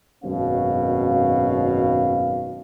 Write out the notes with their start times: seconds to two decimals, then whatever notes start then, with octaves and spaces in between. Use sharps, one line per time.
0.24 G#1 F#2 B2 C#4 F5